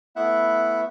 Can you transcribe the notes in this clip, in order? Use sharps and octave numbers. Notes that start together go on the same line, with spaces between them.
A3 B3 E4 E5 F#5 F#6